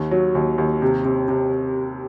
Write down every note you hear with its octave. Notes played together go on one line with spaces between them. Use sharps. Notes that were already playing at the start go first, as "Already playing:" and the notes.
Already playing: D#2
F#3
D#2
D#2
C3
C3
C3